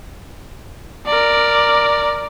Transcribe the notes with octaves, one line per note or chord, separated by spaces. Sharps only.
A#4 D5